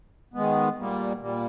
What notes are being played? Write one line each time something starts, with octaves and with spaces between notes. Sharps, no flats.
D#3 G#3 B3
A#2 G3 A#3
A#2 G3 A#3